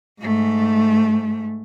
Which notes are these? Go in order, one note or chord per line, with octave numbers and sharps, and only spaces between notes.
G#2 A3